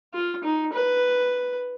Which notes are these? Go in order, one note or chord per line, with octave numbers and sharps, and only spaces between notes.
F4
D#4
B4